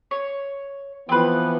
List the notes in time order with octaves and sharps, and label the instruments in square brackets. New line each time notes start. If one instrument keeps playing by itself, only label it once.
[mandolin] C#5
[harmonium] E3 F3 B3 [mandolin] C4 B4